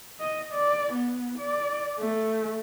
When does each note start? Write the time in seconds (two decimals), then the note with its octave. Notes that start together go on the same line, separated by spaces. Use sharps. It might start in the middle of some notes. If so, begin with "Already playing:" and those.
0.20 D#5
0.53 D5
0.93 B3
1.38 D5
1.99 A3